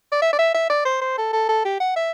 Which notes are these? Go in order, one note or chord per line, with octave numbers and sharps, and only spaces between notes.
D5
E5
D5
E5
E5
D5
C5
C5
A4
A4
A4
G4
F#5
E5